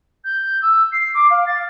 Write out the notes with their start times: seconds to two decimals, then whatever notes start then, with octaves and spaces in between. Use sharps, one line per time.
0.24 G6
0.61 E6
0.92 C7
1.14 D6
1.29 F5
1.46 A6